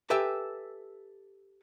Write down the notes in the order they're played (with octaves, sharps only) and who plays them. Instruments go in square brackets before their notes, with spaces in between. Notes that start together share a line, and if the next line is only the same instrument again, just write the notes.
[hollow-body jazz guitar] G4 A4 B4 E5 G5 G#5